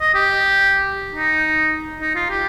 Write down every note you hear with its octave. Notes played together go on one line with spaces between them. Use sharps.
D#5
G4
D#4
D#4
F4
G4